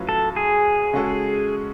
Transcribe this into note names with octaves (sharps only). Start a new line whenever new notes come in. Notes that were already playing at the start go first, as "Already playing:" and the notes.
Already playing: A2 F#3 C#4 F4 B4
A4
G#4
C#3 G#3 C#4 F#4 A4